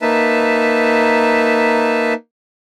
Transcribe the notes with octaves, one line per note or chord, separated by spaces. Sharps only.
A#3 D#4 B4 E5 A5